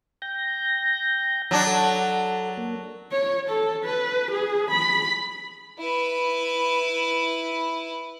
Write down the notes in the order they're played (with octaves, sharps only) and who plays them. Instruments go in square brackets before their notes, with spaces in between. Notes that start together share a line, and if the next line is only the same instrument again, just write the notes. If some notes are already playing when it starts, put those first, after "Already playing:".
[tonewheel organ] G5 G6 A#6
[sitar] F#3 D4
[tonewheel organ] A4
A#3
[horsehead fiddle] C#5
A4
B4
G#4
B5
[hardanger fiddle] E4 B4